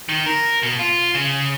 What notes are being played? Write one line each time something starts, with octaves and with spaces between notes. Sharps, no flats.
D#3
A#4
B2
F4
C#3